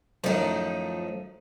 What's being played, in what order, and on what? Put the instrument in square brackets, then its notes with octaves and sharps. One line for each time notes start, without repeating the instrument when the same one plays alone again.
[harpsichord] F#2 A2 D#3 [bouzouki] F3 D#4